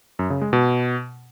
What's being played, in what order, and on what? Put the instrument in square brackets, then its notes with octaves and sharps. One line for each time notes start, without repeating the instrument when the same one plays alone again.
[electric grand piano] F#2
C#3
G#3
B2